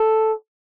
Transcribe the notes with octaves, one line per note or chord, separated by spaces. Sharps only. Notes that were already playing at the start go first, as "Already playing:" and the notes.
Already playing: A4